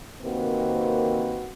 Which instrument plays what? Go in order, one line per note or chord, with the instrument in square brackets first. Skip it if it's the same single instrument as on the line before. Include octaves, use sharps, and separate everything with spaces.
[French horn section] C3 D#3 A#3 C4 F#4 B4